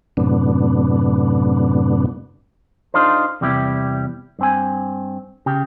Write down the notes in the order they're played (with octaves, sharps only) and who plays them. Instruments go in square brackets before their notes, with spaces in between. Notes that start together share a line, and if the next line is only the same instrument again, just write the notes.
[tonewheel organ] F#2 A2 C3 B3 D4
[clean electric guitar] D4 D#4 F4 A4 C5
E2 C3 G3 E4 G4
G2 C4 G#5
C#3 G4